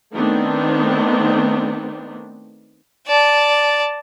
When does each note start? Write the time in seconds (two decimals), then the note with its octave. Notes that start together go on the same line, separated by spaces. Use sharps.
0.14 D#3 A3 B3 C4 D4
3.07 D5 A5